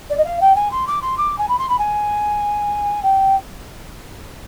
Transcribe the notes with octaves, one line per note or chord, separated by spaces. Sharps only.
D5
D#5
F5
G5
G#5
C6
D6
C6
D6
G#5
B5
C6
B5
G#5
G5